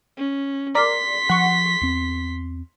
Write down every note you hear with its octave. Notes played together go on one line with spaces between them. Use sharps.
C#4
A#4 D5 C6 B6
F3 F#5 C#6
E2 C4